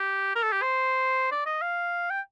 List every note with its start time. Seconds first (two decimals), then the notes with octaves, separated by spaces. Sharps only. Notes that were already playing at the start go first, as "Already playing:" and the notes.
Already playing: G4
0.36 A#4
0.42 A4
0.52 G4
0.62 C5
1.32 D5
1.46 D#5
1.62 F5
2.10 G5